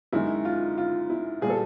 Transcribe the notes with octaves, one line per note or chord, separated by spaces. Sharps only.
F#2 D#3 G#3 E4
F4
F4
E4
A#2 G3 G#4
A4